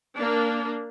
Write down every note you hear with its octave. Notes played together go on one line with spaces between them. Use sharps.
A#3 D4